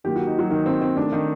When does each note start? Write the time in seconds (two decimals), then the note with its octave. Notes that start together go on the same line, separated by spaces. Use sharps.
0.04 D#3 F#3 A#3 G4
0.16 F#4
0.27 D#4
0.39 F#3 F#4
0.50 D#3 D#4
0.66 C4
0.82 C4
0.97 D#3 A3 C4 D4
1.12 D#3 D#4